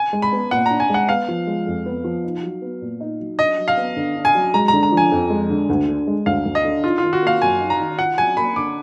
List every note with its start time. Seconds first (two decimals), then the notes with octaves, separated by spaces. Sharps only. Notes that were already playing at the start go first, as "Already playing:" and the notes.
Already playing: G#5
0.13 G#3
0.22 B5
0.32 B3
0.51 A#2 F#5
0.66 D4 A#5
0.80 G#5
0.90 G#3 F#5
1.09 B3 F5
1.28 F3
1.47 G#3
1.67 F2
1.86 B3
2.04 F3
2.24 D#4
2.43 F#3
2.62 B3
2.81 A#2
3.00 D#4
3.19 F#3
3.39 D4 D#5
3.58 F#3
3.68 F5
3.77 B3
3.96 D3
4.16 D4
4.25 G#5
4.35 F#3
4.54 G#3 A#5
4.68 D3 A#5
4.83 A#5
4.92 F3
4.97 G#5
5.12 F2
5.30 G#3
5.50 D3
5.69 D2
5.88 D3
6.07 G#3
6.26 D2 F5
6.46 D2
6.55 D#5
6.65 D3
6.84 D#4 F4
6.98 D#3 F4
7.13 F#4
7.22 A#3 F5
7.42 F#2 G#5
7.61 D#4
7.70 A#5
7.80 D#3
7.99 F4 F#5
8.18 F#3 G#5
8.37 A#3 B5
8.56 D3 D6